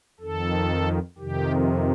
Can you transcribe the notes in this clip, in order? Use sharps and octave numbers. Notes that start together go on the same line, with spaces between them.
F2 D#3 A4
F2 C3 D#3 G4